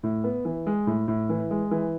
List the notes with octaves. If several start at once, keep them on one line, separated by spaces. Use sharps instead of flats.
A2
B3
E3
G#3
A2
A2
E3
G#3
E3